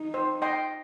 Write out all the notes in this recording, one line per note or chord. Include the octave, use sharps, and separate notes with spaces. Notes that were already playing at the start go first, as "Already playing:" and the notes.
Already playing: D#4
C5
D#5 G5 C6